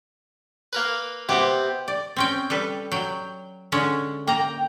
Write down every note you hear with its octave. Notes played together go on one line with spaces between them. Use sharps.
A#3 A#4 B4
C3 B3 C4 G4
D5
C4 C#4 G5
G3 A4 B4
F#3 G5
D3 G#3 C#4
A#3 G5 A#5